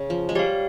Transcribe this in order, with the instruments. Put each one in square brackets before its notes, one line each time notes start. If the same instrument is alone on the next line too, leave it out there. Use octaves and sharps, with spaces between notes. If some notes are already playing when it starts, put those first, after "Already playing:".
Already playing: [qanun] C#3
F3
G#3
[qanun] G3 [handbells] G4 C#5 F5